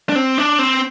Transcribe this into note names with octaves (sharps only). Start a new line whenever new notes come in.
D4
C4
D4
C4